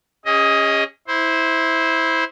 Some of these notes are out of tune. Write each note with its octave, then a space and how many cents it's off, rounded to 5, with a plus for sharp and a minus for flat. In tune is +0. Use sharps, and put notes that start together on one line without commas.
C#4 +0 G#4 -35 D#5 +15
E4 -15 C5 +0